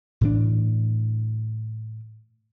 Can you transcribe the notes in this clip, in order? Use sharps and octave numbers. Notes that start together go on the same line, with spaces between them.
A2 E3 D4